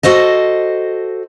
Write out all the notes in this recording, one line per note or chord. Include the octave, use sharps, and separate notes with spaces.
F#4 A4 C5 D#5